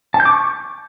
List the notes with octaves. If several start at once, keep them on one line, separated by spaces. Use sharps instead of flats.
A5
G6
D6
C#6